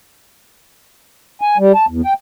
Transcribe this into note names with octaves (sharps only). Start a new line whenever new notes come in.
G#5
G3
A5
E2
G5